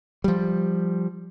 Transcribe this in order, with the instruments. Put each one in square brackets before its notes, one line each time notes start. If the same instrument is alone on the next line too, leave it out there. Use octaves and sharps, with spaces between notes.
[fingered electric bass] F3 G3